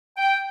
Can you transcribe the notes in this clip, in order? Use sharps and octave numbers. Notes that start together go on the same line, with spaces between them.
G5